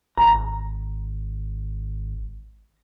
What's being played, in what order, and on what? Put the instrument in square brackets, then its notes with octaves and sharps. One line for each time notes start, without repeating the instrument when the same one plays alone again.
[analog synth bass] G#1 [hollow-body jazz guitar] A#5